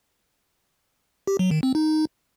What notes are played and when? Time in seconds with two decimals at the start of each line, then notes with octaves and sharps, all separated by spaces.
1.27 G4
1.39 F#3
1.51 D#3
1.63 C4
1.75 D#4